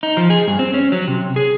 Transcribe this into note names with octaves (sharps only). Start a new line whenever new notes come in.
D#4
F3
G#4
G2
C4
C#4
F#3
C3
G#4